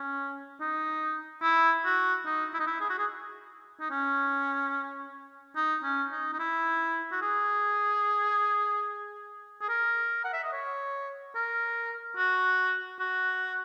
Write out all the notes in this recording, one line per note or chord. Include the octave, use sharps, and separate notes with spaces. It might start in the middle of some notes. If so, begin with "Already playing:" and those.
Already playing: C#4
D#4
E4
F#4
D#4
E4
D#4
E4
G#4
F#4
G#4
D#4
C#4
D#4
C#4
D#4
D#4
E4
F#4
G#4
G#4
A#4
F#5
E5
D#5
C#5
A#4
F#4
F#4